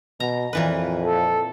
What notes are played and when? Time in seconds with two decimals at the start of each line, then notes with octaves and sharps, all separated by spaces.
0.20 B2 A#5
0.53 F2 A#2 E3 B4
1.06 A4